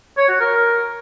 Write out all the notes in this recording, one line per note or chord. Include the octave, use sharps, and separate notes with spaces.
C#5
F#4
A#4